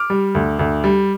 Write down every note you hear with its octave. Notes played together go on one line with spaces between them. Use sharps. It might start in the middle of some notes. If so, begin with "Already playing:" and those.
Already playing: D6 F6
G3
D2
D2
G3